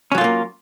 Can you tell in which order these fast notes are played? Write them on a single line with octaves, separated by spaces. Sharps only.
C#4 F#3 F4 A3 A#3